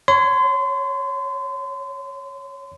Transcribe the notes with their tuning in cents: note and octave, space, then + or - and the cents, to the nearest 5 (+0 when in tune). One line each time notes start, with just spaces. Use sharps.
C#5 +0 C6 -35